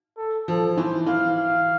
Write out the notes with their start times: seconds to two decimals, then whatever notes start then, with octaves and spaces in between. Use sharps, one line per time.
0.18 A4
0.48 F3 A4
0.77 E3 C5
1.06 E3 F5
1.36 F5